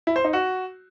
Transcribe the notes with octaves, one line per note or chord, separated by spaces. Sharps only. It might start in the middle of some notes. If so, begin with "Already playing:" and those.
E4
C5
D#4
F#4